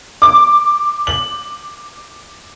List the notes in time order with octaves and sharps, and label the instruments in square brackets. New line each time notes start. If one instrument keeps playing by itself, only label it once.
[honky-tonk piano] D6
F#7